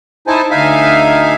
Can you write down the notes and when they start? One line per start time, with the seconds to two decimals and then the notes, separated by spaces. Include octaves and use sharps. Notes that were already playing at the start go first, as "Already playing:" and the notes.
0.27 D#4 E4 C5 G#5 A5
0.51 D2 D#4 E5 F5 G#5